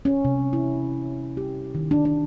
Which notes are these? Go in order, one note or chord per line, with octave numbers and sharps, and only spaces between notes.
C#4
C3
E4
G4
D#3
D4
D4